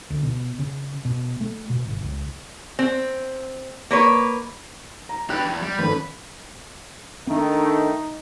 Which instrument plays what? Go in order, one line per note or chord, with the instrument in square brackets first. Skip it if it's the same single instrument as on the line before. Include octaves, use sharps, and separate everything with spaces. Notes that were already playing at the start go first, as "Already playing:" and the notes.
[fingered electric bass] D2
B2
C#3
B2
A3
B2
G1
C#2
[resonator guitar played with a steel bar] C4
A#3 B4 C#5
[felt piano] A#5
[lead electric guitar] G4 B4 [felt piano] F#6
[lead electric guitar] E2
G3
[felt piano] G#1 C#4 A4 [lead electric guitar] B4
[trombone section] D#3 A3 [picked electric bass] C4 D4 [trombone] D#4